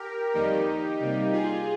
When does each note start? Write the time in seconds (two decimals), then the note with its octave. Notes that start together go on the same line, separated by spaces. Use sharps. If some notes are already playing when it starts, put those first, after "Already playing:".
Already playing: G4 A#4
0.34 F2 D#3 G3 A#3 D#4 G4
1.00 C3 G3 A#3
1.32 F4 G#4